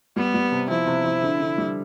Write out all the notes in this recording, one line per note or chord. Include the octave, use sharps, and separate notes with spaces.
G3 B3
G3
C3
F3 E4
C3
F3
D3
D3
G3